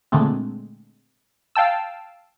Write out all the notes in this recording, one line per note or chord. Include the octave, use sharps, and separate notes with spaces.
A#2 D3 G#3 A3 C4
F5 G5 A5 E6